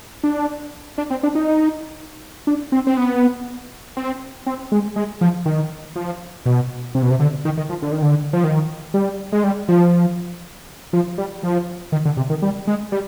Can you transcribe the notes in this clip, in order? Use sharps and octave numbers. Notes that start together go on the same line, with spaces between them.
D4
D4
C4
D4
D#4
D4
C4
C4
B3
C4
C4
G#3
G#3
F3
D#3
F3
B2
C3
B2
C3
D3
D#3
D#3
F3
D3
D#3
D3
F3
D#3
G3
G#3
G3
F3
F3
G3
F3
D#3
D3
C3
D#3
G3
G#3
G3